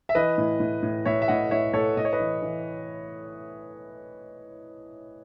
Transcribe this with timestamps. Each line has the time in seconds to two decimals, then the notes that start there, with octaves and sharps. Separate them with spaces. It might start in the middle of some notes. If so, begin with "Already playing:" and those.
0.09 E5
0.15 E3 B4 D#5
0.38 A2
0.60 A2
0.83 A2
1.05 A2 C#5 E5
1.22 E5
1.28 A2 D#5 F#5
1.51 A2 C#5 E5
1.73 A2 A4 C#5
1.97 A2 D#5
2.05 C#5
2.12 B4 D#5
2.20 E3
2.42 E3